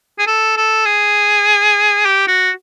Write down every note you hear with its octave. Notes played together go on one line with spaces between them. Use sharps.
G#4
A4
A4
G#4
G4
F#4